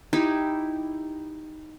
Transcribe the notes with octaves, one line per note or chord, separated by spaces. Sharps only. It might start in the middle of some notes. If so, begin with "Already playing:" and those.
D#4 E4 G4